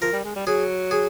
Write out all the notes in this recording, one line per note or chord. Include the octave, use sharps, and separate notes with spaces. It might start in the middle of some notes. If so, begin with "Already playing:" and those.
F3 A#4
G3
G#3
G3
F#3 G#4
G#4